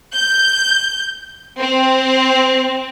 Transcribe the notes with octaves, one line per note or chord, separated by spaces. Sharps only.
G6
C4